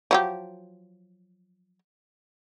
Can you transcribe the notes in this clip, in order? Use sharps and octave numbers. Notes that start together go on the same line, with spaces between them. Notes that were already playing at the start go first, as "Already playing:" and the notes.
F3 F#3 G4